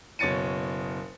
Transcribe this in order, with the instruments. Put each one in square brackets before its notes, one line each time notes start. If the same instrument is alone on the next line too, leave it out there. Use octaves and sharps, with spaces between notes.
[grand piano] F#1 B2 C#5 A6 C#7 D#7